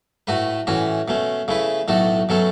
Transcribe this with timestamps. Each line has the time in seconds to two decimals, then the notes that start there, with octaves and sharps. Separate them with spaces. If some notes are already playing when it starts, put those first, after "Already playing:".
0.27 A2 A3 F#4 B4
0.67 A2 E3 C#4 F#4
1.08 B2 A3 C#4
1.48 C#3 A3 E4 B4
1.88 B1 A2 A3 F#4 A4
2.29 B2 F#3 A3 C#4 A4